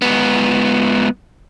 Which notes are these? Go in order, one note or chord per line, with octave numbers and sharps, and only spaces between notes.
G#2 B3